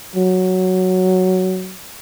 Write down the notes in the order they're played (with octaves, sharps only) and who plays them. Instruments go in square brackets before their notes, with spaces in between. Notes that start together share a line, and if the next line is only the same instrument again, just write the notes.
[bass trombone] F#3